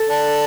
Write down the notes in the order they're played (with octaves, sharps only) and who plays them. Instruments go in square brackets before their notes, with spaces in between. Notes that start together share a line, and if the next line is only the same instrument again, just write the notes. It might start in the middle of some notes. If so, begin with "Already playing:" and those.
Already playing: [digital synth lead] A4
[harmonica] D4